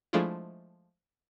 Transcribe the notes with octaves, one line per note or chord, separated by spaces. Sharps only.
F3 G#3 A3 D4 E4 F4